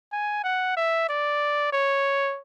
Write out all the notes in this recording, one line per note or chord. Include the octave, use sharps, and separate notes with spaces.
G#5
F#5
E5
D5
C#5